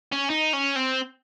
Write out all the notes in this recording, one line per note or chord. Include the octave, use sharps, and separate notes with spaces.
C#4
D#4
C#4
C4